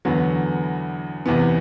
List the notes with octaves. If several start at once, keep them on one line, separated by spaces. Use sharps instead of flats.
E2 D3 F#3 B3
E2 C3 E3 B3